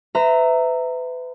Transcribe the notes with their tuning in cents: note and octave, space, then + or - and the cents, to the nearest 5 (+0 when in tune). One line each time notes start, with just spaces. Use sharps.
B4 +35 E5 +0 A#5 -15